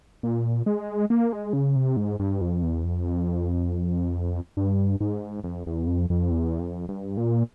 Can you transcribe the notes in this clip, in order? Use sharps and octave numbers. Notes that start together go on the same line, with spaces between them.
A#2
G#3
A#3
G#3
C#3
C3
G#2
G2
F2
E2
F2
G2
G#2
F2
E2
F2
F2
E2
F2
G2
A#2